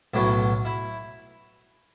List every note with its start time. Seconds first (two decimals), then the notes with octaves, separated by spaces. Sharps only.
0.14 B1 A2 F#3 E4
0.65 E4